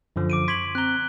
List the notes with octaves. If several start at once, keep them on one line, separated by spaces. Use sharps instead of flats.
F#2 D3 F3
D6 D7 D#7
C6 C#6 G#6 B6 F#7
C4 A#5 F#6 G7